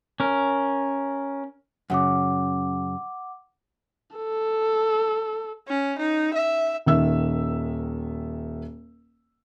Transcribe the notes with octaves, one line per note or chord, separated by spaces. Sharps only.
C#4 A#4
F#2 C#3 F#5 D6
A4
C#4
D#4
E5
D#1 D#3 E5 E6